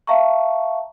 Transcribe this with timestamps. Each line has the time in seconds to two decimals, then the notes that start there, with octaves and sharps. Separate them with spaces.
0.07 E5 F5 A5 A#5 C#6